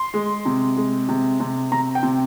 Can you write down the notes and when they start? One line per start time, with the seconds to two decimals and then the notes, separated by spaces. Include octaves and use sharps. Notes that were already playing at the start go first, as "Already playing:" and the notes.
Already playing: C6
0.14 G#3
0.46 C3
0.77 G#3
1.09 C3
1.40 C3
1.72 C3 A#5
1.95 G5
2.03 C3